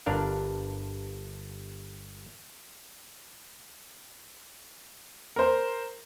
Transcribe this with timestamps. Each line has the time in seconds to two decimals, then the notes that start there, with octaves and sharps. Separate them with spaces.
0.06 G1 G2 D4 A#4 F5
5.36 A#4 C5